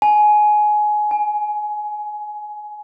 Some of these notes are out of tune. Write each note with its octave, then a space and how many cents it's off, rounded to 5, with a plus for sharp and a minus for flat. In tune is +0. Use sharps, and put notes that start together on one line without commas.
G#5 +20
G#5 -10